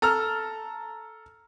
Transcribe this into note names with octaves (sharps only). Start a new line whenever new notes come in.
A4 A#5 E6 F6